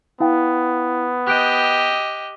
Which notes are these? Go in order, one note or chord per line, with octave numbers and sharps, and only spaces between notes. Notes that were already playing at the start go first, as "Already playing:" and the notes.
B3 E4 F5 G5
G4 D#5 F#6 G6 D7